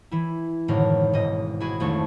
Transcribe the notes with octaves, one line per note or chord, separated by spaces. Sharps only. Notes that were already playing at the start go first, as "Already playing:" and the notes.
E3 E4
G#1 F#2 A2 D3 A#4
E1 G#2 D#5
E4 F#4 G#4
G#1 F2 A3 C#6